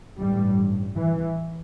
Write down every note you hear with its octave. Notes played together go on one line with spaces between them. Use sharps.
A1 G2 G3
E3